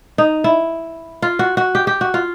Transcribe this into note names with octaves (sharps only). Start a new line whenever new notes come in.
D#4
E4
F4
F#4
F#4
G4
G4
F#4
F4